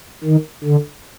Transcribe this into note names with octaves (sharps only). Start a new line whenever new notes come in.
D#3
D3